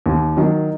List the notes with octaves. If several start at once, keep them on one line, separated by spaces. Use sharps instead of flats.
D#2
D#3 F#3